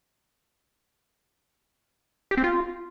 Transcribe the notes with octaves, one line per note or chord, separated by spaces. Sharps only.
G4
C4
F4